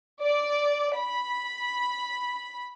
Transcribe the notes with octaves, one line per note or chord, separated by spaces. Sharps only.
D5
B5